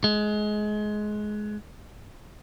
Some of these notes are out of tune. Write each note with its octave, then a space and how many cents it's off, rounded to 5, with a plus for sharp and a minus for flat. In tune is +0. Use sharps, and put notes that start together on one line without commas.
G#3 +20